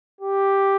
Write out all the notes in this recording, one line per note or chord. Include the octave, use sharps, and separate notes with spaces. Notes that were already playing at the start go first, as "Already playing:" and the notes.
G4